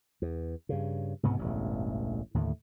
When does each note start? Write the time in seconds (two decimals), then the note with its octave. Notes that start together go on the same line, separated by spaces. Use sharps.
0.22 E2
0.69 G2 C#3
1.23 C#2 G#2 C3 B3
1.37 E1 A1 G2
2.34 D#2 A2 D3 A3